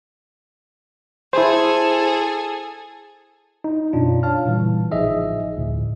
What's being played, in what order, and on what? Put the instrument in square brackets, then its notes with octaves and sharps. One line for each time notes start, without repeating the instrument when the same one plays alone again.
[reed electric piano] E4 C5 [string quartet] G#4 A4
[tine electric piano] D#4
F#2 B2 C#4 D4 F4
C#5 F5 A5 F6
A#2 C#3 E3 G3
A1 F3 D#4 G#4 D#5 E5
D2 A2